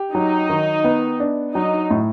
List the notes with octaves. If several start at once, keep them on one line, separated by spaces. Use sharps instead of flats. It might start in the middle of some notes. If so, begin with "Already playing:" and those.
Already playing: G4
F#3 D#4
D#3
B3
D4
F#3 D#4
A2